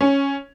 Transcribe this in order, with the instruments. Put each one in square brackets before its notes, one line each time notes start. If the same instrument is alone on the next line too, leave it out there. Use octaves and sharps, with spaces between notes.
[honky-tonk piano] C#4